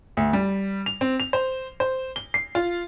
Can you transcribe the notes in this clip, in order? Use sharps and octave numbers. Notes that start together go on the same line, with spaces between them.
D2
G3
F7
C4
F7
C5
C5
G7
C7
F4